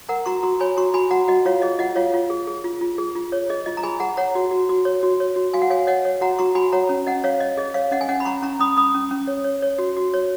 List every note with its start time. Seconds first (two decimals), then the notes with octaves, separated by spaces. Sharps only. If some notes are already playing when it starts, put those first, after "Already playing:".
0.09 A#4 F#5 A#5
0.26 F#4 A#5 C#6
0.43 F#4 A#5 C#6
0.60 C#5 G#5 B5
0.77 F#4 A#5 C#6
0.94 F#4 G#5 B5
1.11 F#4 F#5 A#5
1.28 F#4 D#5 F#5
1.45 F4 C#5 F5
1.62 G#4 D#5
1.79 F4 D#5 F#5
1.96 F4 C#5 F5
2.14 F4
2.30 G#4
2.47 G#4
2.64 F4
2.81 F4
2.98 G#4
3.15 F4
3.32 C#5
3.50 G#4 D#5
3.66 F4 D#5
3.77 A#5
3.83 G#4 G#5 B5
4.00 G#4 F#5 A#5
4.17 C#5 F#5 A#5
4.35 F#4
4.51 F#4
4.69 F#4
4.85 C#5
5.03 F#4
5.20 C#5
5.36 F#4
5.53 F#4 F5 G#5
5.62 F#5
5.70 C#5 F5 G#5
5.87 C#5 D#5 F#5
6.05 C#5
6.21 F#4 F#5 A#5
6.39 F#4 A#5 C#6
6.55 F#4 G#5 B5
6.72 C#5 F#5 A#5
6.89 C#4
7.07 C#4 D#5 F#5
7.24 C#5 F5
7.40 C#5 D#5
7.57 G#4 D#5
7.74 C#5 F5
7.91 C#4 D#5 F#5
8.01 G#5
8.08 C#4 D#5 F#5
8.20 B5
8.25 C#4 A#5 C#6
8.42 C#4 A#5 C#6
8.59 C#4 B5 D#6
8.77 C#4 B5 D#6
8.95 C#4
9.11 C#4
9.27 C#5
9.44 C#5
9.62 C#5
9.78 F#4
9.97 F#4
10.14 C#5